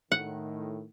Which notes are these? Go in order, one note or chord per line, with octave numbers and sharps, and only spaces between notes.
A2 D#3 F#5